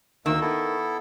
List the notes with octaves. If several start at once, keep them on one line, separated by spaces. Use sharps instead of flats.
D2 D#3 A#3 E6
B3 E4 A4